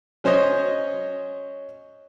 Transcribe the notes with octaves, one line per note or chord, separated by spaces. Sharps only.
F#3 C#4 C5 C#5 D#5